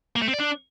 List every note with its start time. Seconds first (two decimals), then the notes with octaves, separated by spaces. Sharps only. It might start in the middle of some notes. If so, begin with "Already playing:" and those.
0.16 A#3
0.22 A3
0.28 C4
0.34 D5
0.40 D4